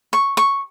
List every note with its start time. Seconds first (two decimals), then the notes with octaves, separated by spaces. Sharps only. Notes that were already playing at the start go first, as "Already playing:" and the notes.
0.13 C#6
0.37 C#6